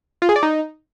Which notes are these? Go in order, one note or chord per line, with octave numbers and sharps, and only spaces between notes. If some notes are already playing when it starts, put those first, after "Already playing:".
F4
G#4
D5
D#4